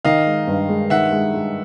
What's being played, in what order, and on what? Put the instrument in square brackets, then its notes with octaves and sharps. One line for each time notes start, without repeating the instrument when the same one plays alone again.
[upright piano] D#3 [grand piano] D#5 F5
[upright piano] G#3
G2
G#3
[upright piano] D#3 [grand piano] E5 F#5
[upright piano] G#3
G#3